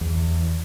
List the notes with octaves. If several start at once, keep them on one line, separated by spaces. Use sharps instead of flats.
E2